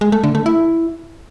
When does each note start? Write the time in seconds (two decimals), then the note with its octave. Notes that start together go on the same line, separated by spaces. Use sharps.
0.01 G#3
0.12 A3
0.23 D3
0.35 A3
0.46 E4